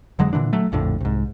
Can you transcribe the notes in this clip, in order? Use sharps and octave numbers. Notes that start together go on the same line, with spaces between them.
F1 D3 F#3 G#3
A#2 D3 E3 D4
F#3 A3
A#1 F2 A2 D3
C2 G#2